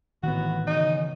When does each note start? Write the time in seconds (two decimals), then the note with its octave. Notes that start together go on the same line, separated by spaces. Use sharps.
0.23 A1 D#3 E3 B3 F#4
0.67 C#3 D#4